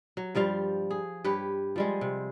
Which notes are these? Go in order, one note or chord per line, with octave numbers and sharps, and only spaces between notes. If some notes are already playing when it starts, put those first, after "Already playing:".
F#3
G2 F3 G3 F5
G#4
G2 G4 B4 C#5
F3 G3 G#3
C3